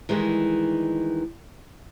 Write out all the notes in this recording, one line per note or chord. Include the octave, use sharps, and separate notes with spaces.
D#3 E3 G3 G#3